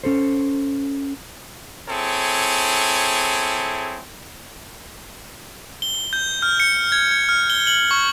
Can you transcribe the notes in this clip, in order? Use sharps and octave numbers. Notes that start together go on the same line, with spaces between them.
C#4 A4 C5
C4 E4 G#4 A4 C#5
G7
G6
F6
C#7
G#6
G#6
F6
G7
F#7
C#6